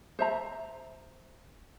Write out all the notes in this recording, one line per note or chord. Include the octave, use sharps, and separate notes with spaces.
C5 E5 A#5